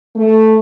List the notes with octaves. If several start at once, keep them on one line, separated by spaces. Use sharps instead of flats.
A3